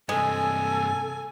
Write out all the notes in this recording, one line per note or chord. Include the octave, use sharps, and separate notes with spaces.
G2 C3 G#3 A4 G#5